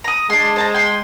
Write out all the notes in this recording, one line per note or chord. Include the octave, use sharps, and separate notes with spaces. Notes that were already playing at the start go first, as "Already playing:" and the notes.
A#5 D#6
G#3 D4 C6
C5 A5 A#5
G5 C6